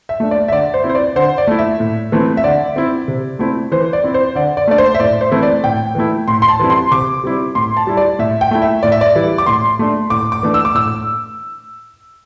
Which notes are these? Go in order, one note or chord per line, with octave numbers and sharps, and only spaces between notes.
E5
A3 D4
D5
E5
D3 D5
C5
C4 E4
C5
D5
D3 C5
D5
A3 E4
E5
A2
E3 A3 C4 E4
E5
D3 D5
C4 E4
C3
A3 C4 E4
E3 C5
D5
C4 E4
C5
D3 D5
D5
A3 D4 D5
C5
E5
A2 D5
C5
E3 A3 C4 E4
D5
A2 G5
E3 A3 E4
A2 C6
C6
A5
E3 G3 C4 E4
C6
C3 D6
G3 C4 E4
A2 C6
A5
G3 E4
D5
A2 E5
G5
A3 E4
E5
A2 D5
E5
D5
E3 G3 E4
D6
A2 C6
A3 D4
A2 D6
D6
E3 A3 D4
E6
D6
A2 E6